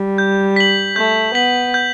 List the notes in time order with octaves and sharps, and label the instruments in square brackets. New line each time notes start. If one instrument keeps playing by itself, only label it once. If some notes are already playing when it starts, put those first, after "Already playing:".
Already playing: [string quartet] G3
[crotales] G6
B6 F#7
[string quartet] A3 [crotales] G6
[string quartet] B3 [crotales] B6 F#7
[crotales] G6